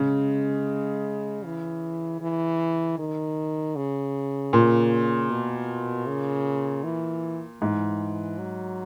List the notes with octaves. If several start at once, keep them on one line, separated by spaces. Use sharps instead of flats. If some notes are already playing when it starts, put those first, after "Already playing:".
Already playing: C#3 G#3
E3
E3
D#3
C#3
A#2
B2
C#3
E3
G#2 E3
F#3